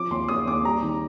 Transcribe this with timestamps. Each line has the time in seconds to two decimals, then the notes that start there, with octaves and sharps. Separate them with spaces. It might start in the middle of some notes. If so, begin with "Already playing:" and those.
Already playing: F3 D6
0.11 D#2 C6
0.28 D#2 D#6
0.47 D#2 D6
0.65 G3 A#5
0.83 D#3